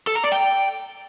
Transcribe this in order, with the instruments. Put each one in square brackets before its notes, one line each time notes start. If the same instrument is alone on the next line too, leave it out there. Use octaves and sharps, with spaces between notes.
[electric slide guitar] A4
A#5
D5
G5